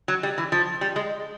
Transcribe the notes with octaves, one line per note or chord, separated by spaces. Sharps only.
F#3
G3
E3
F3
G3
G#3